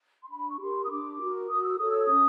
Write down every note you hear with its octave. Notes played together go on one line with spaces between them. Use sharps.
C6
D4 B5
C#6
G4 A#4 C6
D#6
D4 D6
F#4 A#4
F#4 D#6
E6
A4 C#5 D#6
E6
D#6
C#4